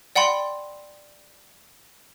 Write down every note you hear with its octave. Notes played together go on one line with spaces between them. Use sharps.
D5 F#5 G5 B5 C6